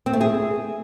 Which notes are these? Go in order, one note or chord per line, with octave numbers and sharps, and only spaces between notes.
C4
A3
G#4